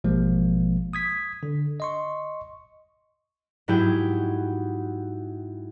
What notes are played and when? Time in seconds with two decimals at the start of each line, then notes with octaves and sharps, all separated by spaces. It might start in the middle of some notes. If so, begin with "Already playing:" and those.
0.04 A1 B2 F3 G#3 A#3
0.93 D#6 G#6 B6
1.43 D3
1.80 D#5 C6 C#6
3.68 G#2 F#3 E4 G4 G#4 G5